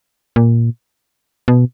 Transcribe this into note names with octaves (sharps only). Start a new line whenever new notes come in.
A#2
B2